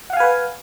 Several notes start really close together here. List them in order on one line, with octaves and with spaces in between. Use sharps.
F#5 F5 G#5 B4